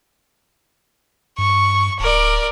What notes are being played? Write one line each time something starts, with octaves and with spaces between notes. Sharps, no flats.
G2 C#6
D1 A#4 D5